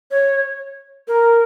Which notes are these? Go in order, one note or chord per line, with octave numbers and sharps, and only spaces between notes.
C#5
A#4